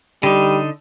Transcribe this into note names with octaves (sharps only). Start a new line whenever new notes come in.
D3 G3 D#4